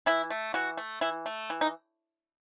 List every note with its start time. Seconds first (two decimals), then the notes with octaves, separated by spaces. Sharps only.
0.06 E3 E4
0.30 A3
0.54 E3 F#4
0.77 A3
1.01 E3 E4
1.26 A3
1.50 E3
1.61 D#4